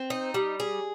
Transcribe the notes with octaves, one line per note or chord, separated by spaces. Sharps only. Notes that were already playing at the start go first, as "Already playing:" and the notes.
Already playing: C4
D#4
G3
G#4